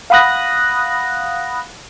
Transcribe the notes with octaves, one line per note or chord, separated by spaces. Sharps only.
F5 F#5 B5 D#6 F#6 A#6